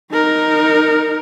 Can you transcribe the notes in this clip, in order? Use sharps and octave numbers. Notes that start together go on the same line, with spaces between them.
D#4 A#4